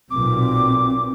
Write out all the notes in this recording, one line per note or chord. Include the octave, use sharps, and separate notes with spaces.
B1 A#2 C4 D6